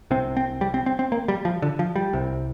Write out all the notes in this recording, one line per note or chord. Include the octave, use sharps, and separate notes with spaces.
C2 C3 C4
C4
G3
C4
C4
C4
A#3
G3
F3
D3
F3
G3
C2 C3